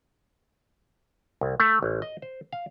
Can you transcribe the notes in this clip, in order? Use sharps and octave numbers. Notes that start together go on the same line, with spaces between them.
C2
A3
A1
D#5
C5
F5